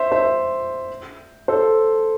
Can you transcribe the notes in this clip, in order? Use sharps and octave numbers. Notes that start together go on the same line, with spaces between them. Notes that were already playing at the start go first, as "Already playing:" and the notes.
Already playing: C5 E5
C5 E5
A4 C5